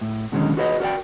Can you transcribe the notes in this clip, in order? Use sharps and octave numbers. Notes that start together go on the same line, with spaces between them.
A2
B2 D3 D#3 F#3 G#3 C#4
F#4 G#4 B4 C#5 D#5
F#4 A#4 C#5 D5 G5